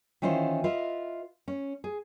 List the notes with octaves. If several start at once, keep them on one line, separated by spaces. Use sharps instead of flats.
D#3 E3 C#4 E4 F4 C5
F4 B4 D#5 E5
C#4
G#4